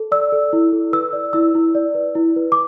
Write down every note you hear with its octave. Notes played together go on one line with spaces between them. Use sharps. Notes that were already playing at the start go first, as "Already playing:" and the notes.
Already playing: A4
D5 E6
A4
E4
A4
B4 E6
D5
E4 E6
E4
D5
B4
E4
B4
D6